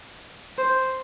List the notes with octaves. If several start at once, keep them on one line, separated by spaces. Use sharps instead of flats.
C5